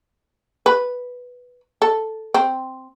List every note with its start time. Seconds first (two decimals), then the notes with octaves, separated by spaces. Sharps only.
0.66 B4
1.82 A4
2.34 C4